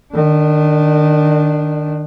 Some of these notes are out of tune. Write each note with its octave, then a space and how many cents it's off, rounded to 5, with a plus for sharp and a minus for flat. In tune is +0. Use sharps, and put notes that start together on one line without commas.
D#3 -25 D4 +0